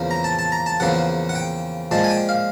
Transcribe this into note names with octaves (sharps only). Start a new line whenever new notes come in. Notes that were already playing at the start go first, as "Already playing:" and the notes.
Already playing: E2 C#3 F3 A#3
A#5
A5
A5
A#5
A5
E2 C#3 F3 A#3 F#5
F#5
G5
A#2 F3 G#3 A5
G#5
G5
F5